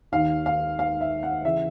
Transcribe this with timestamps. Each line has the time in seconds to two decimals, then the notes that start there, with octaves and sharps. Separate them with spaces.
0.12 D#2 D#3 F5
0.46 F5
0.79 F5
1.01 E5
1.23 F#5
1.45 C#3 E3 E5